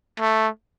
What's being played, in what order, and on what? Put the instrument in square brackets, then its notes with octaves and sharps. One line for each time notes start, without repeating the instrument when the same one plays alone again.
[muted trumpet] A3